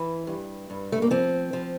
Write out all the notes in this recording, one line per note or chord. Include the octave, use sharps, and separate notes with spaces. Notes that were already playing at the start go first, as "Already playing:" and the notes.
Already playing: E3
G2
G2
A3
A#3
F3 C4
F3